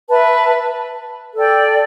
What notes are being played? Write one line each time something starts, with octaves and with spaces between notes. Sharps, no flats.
B4 E5 A5
A4 D5 G5